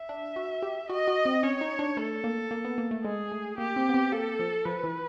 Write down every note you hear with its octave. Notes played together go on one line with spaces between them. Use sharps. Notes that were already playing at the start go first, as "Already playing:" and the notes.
Already playing: E5
D4
F#4
G4
F#4 D#5
F#4
C4
C#4 C#5
D#4
D4
A3 A4
A#3
A#3
B3
A#3
A3
G#3 G#4
A3
A#3 G4
C4
B3
C4
A#3 A4
F3
F3 B4
E3